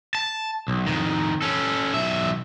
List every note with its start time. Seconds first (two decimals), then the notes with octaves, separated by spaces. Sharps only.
0.15 A5
0.68 B1
0.87 F2 D#3
1.42 C#4 A4
1.94 B1 E5